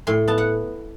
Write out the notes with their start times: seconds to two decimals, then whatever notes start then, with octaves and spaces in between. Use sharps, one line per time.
0.07 A2 C6
0.28 B3 A5
0.38 F#5